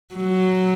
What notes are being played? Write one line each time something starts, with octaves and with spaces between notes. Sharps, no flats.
F#3